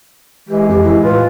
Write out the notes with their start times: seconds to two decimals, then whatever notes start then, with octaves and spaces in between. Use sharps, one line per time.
0.49 E3 G#3 G4
0.69 F2 G4
0.83 E3 E4
1.04 A2 F4 B4